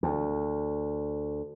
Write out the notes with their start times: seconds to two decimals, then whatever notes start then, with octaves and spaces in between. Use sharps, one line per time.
0.03 D2